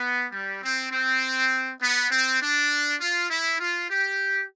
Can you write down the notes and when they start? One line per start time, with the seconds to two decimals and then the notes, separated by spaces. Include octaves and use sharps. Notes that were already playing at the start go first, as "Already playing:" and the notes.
Already playing: B3
0.32 G3
0.62 C4
0.92 C4
1.81 B3
2.11 C4
2.41 D4
3.01 F4
3.30 E4
3.60 F4
3.90 G4